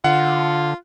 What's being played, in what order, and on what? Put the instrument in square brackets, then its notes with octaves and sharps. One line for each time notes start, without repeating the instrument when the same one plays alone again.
[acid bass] D3 [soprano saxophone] F4 [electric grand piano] F#5